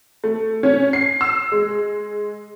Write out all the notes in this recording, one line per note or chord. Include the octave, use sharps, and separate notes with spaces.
A3
C#4
C7
E6
G#3